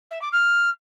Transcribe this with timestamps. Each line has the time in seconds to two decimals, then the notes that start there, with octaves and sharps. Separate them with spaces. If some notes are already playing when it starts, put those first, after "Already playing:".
0.11 E5
0.21 D6
0.32 F6